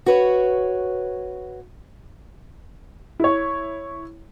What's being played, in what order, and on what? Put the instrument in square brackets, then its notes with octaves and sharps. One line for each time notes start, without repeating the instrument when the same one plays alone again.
[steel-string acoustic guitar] F#4 B4 C#5
[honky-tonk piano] E4 C#5